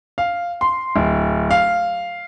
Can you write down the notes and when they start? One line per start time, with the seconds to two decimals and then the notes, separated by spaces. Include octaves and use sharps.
0.18 F5
0.61 C6
0.96 D1
1.51 F5